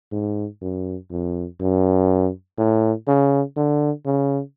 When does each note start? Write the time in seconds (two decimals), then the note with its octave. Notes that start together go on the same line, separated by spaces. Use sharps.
0.12 G#2
0.62 F#2
1.11 F2
1.60 F#2
2.58 A2
3.08 C#3
3.57 D3
4.06 C#3